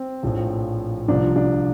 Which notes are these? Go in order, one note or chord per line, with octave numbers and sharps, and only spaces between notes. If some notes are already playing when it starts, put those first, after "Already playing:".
Already playing: C4
A#1 A2 F3
C2 A#2 F3 D4
D4